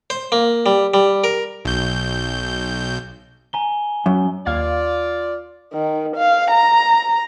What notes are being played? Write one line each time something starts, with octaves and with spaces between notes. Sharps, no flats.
C5
A#3
G3
G3
A#4
B1 G6
G#5 A#5 G7
F#2
D#2 F4 D5 F5 G#6
D#3
F5
A#5